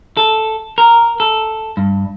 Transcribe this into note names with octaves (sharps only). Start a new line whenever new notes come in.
A4
A#4
A4
G2